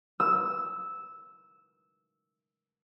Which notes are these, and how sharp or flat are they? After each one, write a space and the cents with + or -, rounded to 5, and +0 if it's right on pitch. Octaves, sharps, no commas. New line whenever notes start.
E6 -10